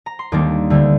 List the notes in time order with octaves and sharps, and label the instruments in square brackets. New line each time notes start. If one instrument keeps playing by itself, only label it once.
[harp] A#5
C6
D#2 D#3 G3 A#3 D4 D6
D2 D3 G3 D4